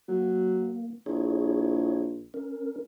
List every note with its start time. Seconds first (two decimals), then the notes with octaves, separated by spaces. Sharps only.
0.08 F#3 A#3
1.06 A#1 E4 G#4 C#5
2.34 C#4 A#4